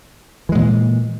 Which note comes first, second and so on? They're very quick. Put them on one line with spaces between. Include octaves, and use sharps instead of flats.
E3 G#3 A#2